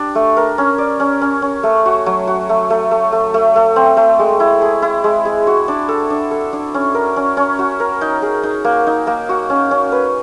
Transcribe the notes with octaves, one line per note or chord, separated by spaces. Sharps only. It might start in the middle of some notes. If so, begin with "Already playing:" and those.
Already playing: D4 G4
A3
A#4
C#4
D5
C#4
C#4
C#4
A3
F#4
F#3
F#4
A3
A3
A3
A3
A3
A3
C4
A3
G#3
E4
G#4
E4
G#3
G#4
F#4
D4
A4
D4
A4
D4
C#4
A#4
C#4
C#4
F#4
A#4
D#4
G#4
D#4
A#3
D#4
A#3
F#4
C#4
C#4
B4